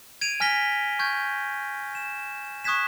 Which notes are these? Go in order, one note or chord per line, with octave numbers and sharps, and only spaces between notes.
G#6 D7 D#7 F7
G#5 F6 A#6 B6 G7
C#6 F6 G6 G#6
E7
C#6 D#6 F#6 G#6 B6 E7